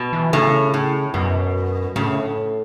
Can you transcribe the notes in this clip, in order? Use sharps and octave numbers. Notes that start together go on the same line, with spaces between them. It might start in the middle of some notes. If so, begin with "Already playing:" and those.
Already playing: B2
E3
A2 C#3
A2
F#2 B2
A2 C#3